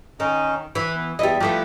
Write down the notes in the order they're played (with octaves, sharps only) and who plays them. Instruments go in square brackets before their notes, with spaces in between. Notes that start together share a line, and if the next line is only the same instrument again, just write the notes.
[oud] D#3 [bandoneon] C#4 D#4
[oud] E3 [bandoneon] B5
[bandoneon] B3
[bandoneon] E2 E4 [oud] G3 D#5
[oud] F3 A3 B3 [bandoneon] E4 G4 G5